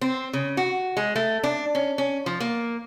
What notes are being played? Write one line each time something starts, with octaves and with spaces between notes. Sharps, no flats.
C4
C#3
F#4
G#3
A3
D4
C#4
C#4
F3
A#3